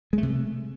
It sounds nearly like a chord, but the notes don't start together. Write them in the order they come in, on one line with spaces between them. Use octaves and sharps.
G#3 A3 C3